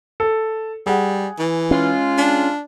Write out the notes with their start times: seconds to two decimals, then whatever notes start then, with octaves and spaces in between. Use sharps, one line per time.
0.20 A4
0.87 G3 G#4 F#5
1.39 E3
1.71 G#3 C#4 F4
2.18 D4